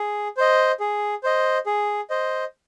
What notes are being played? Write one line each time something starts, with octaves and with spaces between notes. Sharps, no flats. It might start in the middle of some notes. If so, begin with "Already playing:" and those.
Already playing: G#4
C5 D#5
G#4
C5 D#5
G#4
C5 D#5